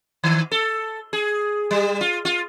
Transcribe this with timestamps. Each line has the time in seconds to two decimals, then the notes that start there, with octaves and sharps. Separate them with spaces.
0.24 D#3
0.51 A4
1.13 G#4
1.71 G3
2.01 F4
2.25 F4